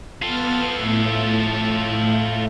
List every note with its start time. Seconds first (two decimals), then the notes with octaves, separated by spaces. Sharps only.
0.22 B3 F4 A4 F6
0.75 A2 A3